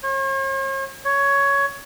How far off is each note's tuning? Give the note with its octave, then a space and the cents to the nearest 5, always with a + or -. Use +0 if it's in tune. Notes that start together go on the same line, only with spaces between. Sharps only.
C#5 -45
C#5 +10